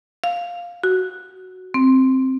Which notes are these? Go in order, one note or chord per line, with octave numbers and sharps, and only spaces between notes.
F5
F#4
C4